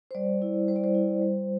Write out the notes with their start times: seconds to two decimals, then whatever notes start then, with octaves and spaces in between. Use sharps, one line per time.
0.11 C5
0.15 G3 D5
0.42 E4
0.68 G3 C5
0.76 D5
0.84 C5
0.95 E4
1.22 G3